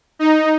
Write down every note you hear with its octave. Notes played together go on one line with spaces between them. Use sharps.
D#4